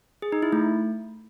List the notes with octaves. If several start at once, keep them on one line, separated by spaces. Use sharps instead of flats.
G#4
D#4
E4
A3